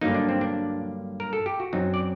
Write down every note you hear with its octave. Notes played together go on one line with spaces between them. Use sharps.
G2 D3 F#3 A#3 D#4
D4
C4
D4
A#4
A4
G4
F#4
F#2 F#3 C4 D#4
D5